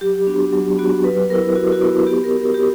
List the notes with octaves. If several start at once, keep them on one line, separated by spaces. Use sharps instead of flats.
F#3 G4
B3 D4 F#4
F#3
B3 D4 F#4
F#3 B4
B3 E4 A#4
F#3 F#4
F#4
B3 E4
B3 G4
A#4
F#4
A#4
B3 G4